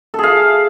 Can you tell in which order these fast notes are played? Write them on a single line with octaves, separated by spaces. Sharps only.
A4 G#4 F5